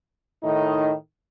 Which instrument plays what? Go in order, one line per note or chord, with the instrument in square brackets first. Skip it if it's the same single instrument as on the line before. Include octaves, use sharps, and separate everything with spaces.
[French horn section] A2 D#3 D#4